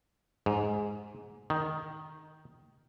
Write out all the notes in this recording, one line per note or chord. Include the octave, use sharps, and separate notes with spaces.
G#2
D#3